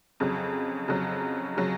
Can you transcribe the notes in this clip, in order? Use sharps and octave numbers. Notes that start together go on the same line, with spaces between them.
F2 C#3 F#3
F2 C#3 F#3
C#3 F#3